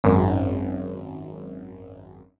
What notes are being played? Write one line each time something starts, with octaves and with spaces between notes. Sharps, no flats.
G#1 F#2